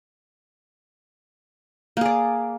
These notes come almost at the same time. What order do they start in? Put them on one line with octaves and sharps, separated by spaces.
A#3 G#4 D5